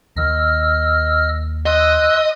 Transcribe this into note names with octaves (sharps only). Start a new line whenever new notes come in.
D#2 D#3 D#5 E6 F6
D#5 C6 E6 F#6